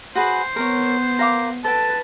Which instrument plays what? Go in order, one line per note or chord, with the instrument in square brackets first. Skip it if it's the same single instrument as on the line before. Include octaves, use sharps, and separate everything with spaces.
[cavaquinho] F#4 G#4 B4 [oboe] C5
[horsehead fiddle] B3 [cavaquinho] A#4 C#5
[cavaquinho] A#4 F5 D6
[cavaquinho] A4 G5 [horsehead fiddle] B4 [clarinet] A5